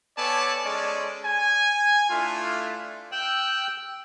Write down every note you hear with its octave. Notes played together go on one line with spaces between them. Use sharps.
B3 A4 C#5 D5 G#5 A5
G#3 C#4 A4 D5
G#5
A3 D4 E4 F4
G5 E6 F#6